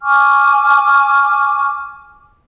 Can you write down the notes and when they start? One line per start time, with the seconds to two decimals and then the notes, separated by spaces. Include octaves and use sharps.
0.03 G#5 C#6 D6 F6